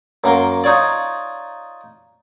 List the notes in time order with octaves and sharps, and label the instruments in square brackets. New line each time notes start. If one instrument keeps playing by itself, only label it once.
[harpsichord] F#2 A#3 A#4 C6
D#4 F4 C#5 D5